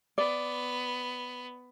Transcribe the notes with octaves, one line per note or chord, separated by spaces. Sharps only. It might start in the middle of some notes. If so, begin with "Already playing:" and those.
B3 D5